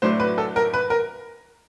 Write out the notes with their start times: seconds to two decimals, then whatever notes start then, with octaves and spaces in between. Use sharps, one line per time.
0.02 A2 F#3 A3 D4 C5
0.20 B4
0.38 A4
0.56 A#4
0.74 B4
0.90 A#4